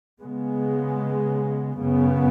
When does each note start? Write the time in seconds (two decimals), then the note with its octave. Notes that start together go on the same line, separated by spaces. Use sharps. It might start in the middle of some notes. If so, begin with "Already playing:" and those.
0.20 C#3 G#3 B3
1.79 F#2 C#3 B3